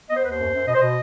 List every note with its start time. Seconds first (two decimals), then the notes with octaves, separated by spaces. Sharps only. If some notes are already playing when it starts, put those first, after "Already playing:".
0.10 B3 D#5
0.17 C5
0.24 D#2 B4
0.32 C5
0.38 F#2
0.53 F#2
0.67 B2 D#5
0.75 C5
0.81 B2 D#5